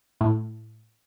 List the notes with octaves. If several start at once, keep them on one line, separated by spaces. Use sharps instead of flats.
A2